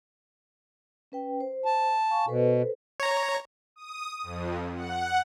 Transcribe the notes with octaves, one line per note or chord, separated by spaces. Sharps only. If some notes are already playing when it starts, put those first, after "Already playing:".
C#4 B4 G5
C5
A5
F5 G#5 C#6
B2 A4 B4 C5
C#5 A#5
D#6
F2
F#5